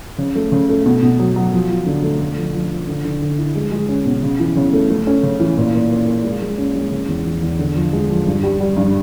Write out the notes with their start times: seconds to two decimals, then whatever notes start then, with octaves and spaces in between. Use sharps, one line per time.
0.18 C#3
0.35 A3
0.52 C#3
0.69 A3
0.85 B2
1.02 B2
1.19 F#3
1.36 F#3
1.53 F3
1.70 F3
1.86 D3
2.03 A3
2.20 A3
2.37 F3
2.54 F3
2.71 F3
2.88 D3
3.05 D3
3.22 D3
3.38 E4
3.55 G#3
3.72 G#3
3.89 C#4
4.05 B2
4.23 C#3
4.40 E3
4.56 C#3
4.73 A3
4.90 A3
5.07 C#4
5.23 C#3
5.40 E3
5.57 A#2
5.74 A#2
5.91 A#2
6.08 A#3
6.24 G#3
6.42 G#3
6.58 C#4
6.75 G#3
6.92 C#3
7.08 E2
7.26 E3
7.42 E2
7.59 D3
7.76 F3
7.93 G#3
8.10 F3
8.27 G2
8.43 G3
8.60 G3
8.77 G2